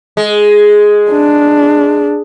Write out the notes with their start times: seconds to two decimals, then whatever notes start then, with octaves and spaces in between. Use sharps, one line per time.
0.17 G#3
1.11 D4